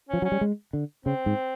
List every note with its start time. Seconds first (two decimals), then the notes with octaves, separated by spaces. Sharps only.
0.09 F3 C#4
0.22 F#3 C#4
0.32 G3
0.41 G#3
0.73 D3
1.05 C#3 C4
1.26 G#2